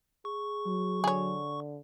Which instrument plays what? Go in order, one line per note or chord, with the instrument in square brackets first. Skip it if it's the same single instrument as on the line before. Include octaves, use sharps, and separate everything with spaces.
[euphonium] G#4 [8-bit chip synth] C#6
[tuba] F#3
[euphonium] D3 [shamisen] G#4 C#5